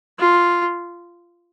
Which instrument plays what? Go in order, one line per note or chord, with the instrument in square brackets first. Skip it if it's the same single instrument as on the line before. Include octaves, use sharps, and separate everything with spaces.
[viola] F4